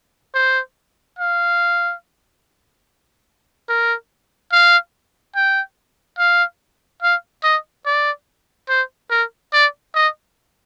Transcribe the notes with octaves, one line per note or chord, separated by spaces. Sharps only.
C5
F5
A#4
F5
G5
F5
F5
D#5
D5
C5
A#4
D5
D#5